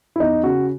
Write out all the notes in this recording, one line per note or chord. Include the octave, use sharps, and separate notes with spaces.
E4
E2 D#4
C#3 F#4